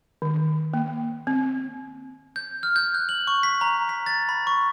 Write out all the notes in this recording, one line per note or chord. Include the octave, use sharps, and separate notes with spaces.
D#3
A#3
C4
G6
F6
G6
F#6
F#7
C#6
B6
A#5
B6
A6
B5
C#6